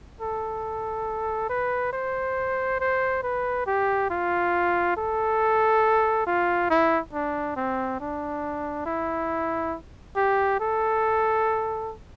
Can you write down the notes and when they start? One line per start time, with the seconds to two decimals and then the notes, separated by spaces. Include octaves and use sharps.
0.21 A4
1.49 B4
1.93 C5
2.80 C5
3.23 B4
3.66 G4
4.10 F4
4.97 A4
6.26 F4
6.70 E4
7.13 D4
7.56 C4
8.00 D4
8.86 E4
10.16 G4
10.60 A4